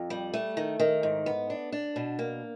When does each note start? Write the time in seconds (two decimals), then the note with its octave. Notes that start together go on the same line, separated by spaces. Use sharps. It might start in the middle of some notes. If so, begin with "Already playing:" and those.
Already playing: F2
0.10 G3
0.34 A3
0.57 D#3
0.79 D#3
1.03 G#2
1.26 B3
1.50 D4
1.72 D4
1.96 B2
2.19 A#3